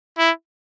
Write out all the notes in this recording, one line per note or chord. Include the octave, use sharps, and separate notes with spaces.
E4